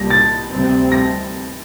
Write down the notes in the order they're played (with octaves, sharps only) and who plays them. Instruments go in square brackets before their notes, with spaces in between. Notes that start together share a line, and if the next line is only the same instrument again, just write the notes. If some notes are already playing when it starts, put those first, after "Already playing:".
Already playing: [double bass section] C2 A#2 G3 [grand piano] A#6
[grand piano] A6
[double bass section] D2 C3 G3 C4
[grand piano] A#6